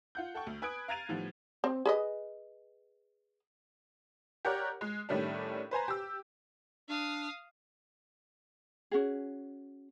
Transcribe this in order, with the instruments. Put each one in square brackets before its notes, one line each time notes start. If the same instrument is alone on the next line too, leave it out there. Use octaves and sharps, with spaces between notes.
[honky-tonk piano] F4 F#5 G6
A4 F#5 G5 C#6
D2
B4 G#5 D#6 F#6 G#6 D7
F5 A#5 G#6 A6 D#7 F7
A2 D#3 F3 G3 B3
[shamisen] C4
G#4 B4 D#5
[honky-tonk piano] G4 A#4 C#5 D5 F#5
G#3
A2 D#3 G3 A3 C#4 D4
B4 C5 G#5 A#5
G4 E6
[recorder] D4 [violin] F5 D#6
[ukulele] C#4 F#4 G#4